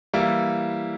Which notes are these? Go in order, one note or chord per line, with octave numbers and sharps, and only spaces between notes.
E3 G3 A#3 E4